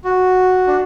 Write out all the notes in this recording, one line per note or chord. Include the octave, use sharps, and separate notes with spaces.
F#4
D4